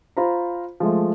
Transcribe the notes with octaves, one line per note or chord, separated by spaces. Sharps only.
F4 C5 A#5 B5
F3 G#3 A3